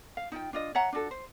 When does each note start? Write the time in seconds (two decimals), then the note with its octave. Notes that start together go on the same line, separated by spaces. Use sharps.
0.17 F5
0.32 D#4 F4 G5
0.53 D4 F4 D#5
0.75 C#5 E5 F#5 A#5
0.93 D4 F4 F#4 A4
1.11 C5